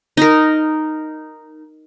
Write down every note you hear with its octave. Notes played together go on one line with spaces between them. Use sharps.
D#4 A#4